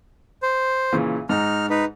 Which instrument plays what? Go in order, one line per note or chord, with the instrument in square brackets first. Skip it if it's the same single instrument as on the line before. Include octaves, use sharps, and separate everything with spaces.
[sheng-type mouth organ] C5
[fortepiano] A#2 C#3 E3
[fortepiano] G#2 A#5 [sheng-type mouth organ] D#4 F6
[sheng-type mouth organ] D#4 B4